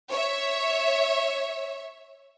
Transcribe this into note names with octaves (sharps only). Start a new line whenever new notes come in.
C#5 E5